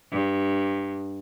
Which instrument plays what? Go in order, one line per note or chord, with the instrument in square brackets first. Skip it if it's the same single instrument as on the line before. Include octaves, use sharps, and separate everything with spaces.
[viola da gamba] G2